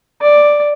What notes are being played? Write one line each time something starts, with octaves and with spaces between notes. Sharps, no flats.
D5